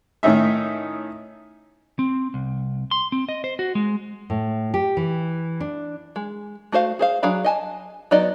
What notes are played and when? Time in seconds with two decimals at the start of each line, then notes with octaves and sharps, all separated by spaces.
0.23 A2 D#3 C#4 D#4 E5
1.99 C4
2.34 C2
2.91 C6
3.12 C4
3.29 D#5
3.44 C5
3.59 F#4
3.75 G#3
4.30 A2
4.74 G4
4.97 E3
5.60 D4
6.16 G#3
6.72 A3 F#4 C5 F5
6.99 G#4 C5 F5
7.23 F#3 D4 G#4 F5 B5
7.44 D#5 G#5 A5
8.11 F#3 B3 D#4 D5 D#5